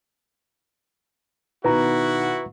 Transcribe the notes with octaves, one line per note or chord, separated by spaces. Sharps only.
B2 D#3 E4 F#4 B4 A#5